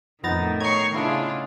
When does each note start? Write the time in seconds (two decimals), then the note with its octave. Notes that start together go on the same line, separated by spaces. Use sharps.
0.24 F2 A2 D#3 B3 D#4 A#5 A6
0.60 C#5 D#5 A#5 B5 C#6 G#6 C7
0.94 C#3 D4 E4 F4 G#4 D#5